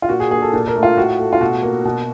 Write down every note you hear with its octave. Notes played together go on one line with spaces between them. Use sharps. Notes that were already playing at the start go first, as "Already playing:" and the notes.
F4
A#2 F#4
G#4
A#3 G#4
A4
A#2 A4
A4
A#4
A3
F4
A2 F#4
A3
F4
B2 F#4
A#3
B2